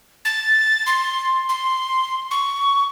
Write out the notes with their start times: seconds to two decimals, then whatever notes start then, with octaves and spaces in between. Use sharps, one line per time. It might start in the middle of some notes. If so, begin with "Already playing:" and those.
0.25 A6
0.86 C6
1.49 C6
2.31 C#6